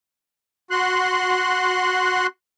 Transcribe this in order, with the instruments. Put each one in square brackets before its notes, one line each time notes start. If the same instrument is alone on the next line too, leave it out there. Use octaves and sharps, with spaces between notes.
[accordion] F#4 C6 F#6